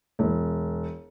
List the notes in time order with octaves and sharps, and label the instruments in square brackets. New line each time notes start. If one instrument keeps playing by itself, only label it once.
[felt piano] E1